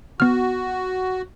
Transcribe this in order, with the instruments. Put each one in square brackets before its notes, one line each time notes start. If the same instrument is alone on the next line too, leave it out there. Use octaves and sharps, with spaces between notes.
[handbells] B3 F6 [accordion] F#4